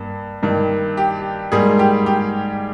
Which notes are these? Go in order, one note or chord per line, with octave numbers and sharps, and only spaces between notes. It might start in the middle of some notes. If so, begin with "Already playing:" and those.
Already playing: G2 A#3
G2 D#3 A#3
G4
G#2 G3 A#3 G#4
G4
G4